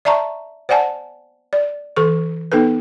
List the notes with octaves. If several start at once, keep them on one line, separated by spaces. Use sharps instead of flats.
D5 E5 A5 A#5 C#6
C5 D5 F#5 G#5 A5
D5
E3 A4 C#6
B3 D#4 A4 B4